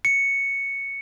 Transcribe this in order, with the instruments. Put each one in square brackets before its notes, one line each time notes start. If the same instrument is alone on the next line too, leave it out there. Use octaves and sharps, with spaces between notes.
[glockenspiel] C#7